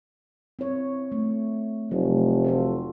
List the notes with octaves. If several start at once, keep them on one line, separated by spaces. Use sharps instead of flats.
C4 E4 C#5
A3
F1 F#3 E4
F4 F#4 A4